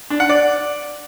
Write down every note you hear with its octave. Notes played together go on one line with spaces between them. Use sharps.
D4
F#5
D5